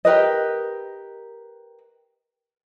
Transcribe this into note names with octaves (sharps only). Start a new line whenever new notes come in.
G4 A#4 B4 D#5